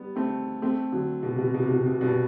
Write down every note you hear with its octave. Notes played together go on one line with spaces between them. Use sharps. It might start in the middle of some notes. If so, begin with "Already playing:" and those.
Already playing: G3 B3
A3 C4
A3 C4
D3 F#3
B2
C3
B2
C3
B2
C3
B2
C3
B2
C3
G2 B2